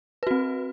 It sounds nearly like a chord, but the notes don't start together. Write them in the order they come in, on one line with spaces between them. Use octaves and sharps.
B4 F#4 C4